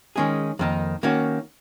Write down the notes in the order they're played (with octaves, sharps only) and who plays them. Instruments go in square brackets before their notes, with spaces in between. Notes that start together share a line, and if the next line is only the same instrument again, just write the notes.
[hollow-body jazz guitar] D#3 G#3 C#4 G#4
F2 D#3 A#3 D#4
D#3 A#3 C#4 F#4